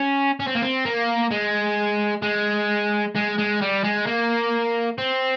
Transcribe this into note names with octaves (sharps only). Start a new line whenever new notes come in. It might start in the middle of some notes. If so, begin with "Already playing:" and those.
Already playing: C#4
C#4
C4
A#3
C4
A#3
G#3
G#3
G#3
G#3
G3
G#3
A#3
C4